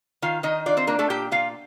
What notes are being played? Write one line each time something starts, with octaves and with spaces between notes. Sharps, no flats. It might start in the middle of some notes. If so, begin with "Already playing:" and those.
D#3 F4 F5
D#3 D#4 D#5
D4 F4 D5
C4 C5
A#3 D4 A#4
A3 A4
A#2 G4 G5
A#2 F4 F5